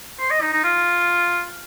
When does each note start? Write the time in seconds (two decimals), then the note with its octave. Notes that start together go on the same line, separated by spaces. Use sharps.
0.20 C5
0.31 D#5
0.41 D#4
0.53 D#4
0.64 F4